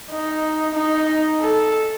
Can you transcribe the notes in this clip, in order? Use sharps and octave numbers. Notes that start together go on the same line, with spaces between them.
D#4
D#4
A4